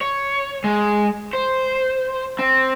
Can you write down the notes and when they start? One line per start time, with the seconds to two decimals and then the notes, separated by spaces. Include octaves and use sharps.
0.01 C#5
0.64 G#3
1.33 C5
2.39 C4